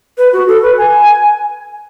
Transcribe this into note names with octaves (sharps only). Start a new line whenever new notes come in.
B4
F#4
A4
B4
G#5